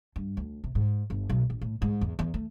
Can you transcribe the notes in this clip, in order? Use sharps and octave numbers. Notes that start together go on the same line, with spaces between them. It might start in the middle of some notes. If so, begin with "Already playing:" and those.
G2
D2
C3
G#2
G1
B1
A#1
A2
G#2
E2
E2
A3